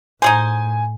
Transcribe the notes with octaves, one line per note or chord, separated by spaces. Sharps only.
A2 D#4 G#4 C5 G#5